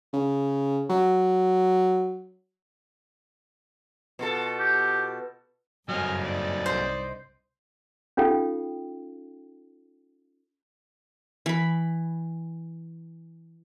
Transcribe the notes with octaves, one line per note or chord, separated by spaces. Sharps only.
C#3
F#3
B2 F4 A4
G4
F#1 G2 F#3 C4 D#5 G#5 F6
D#4 D5
C2 C5
C#4 D#4 F4 A4 F5 G5
E3 B5